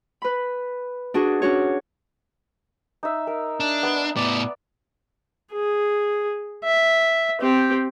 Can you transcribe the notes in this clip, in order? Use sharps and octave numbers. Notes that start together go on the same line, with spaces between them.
B4 B5
D4 F#4 G#4
C#4 D4 F#4 C#5
D#4 E5
A#4
D4
B3 B4
A2 B3 D5
G#4
E5
C4 G4